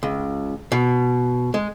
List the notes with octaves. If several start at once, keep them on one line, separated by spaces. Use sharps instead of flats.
C#2
B2
G#3